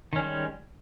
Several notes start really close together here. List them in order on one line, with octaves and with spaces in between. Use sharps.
D#3 C#4 G3 G#3